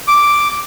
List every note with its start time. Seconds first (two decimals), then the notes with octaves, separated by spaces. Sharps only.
0.08 D6